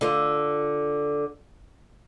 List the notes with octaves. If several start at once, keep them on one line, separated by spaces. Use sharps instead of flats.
D3 F4